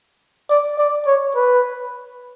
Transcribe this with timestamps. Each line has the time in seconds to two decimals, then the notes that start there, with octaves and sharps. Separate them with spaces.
0.50 D5
0.78 D5
1.07 C#5
1.35 B4